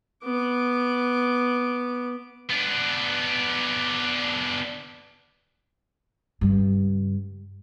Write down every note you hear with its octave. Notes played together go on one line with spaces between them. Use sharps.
B3 D6
B3 D4
G2 C#3